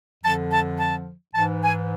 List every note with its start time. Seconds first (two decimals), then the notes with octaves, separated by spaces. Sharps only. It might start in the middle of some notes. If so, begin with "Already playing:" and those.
0.23 F2 D3 F3 A5
0.51 A5
0.78 A5
1.34 G#2 E3 A5
1.63 G#5